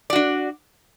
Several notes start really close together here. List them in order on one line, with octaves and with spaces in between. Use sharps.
D5 F#4 D4